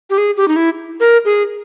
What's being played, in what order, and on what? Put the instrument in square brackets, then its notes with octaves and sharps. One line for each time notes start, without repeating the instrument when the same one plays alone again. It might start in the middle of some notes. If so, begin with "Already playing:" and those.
[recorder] G4
G#4
G4
D#4
E4
A#4
G#4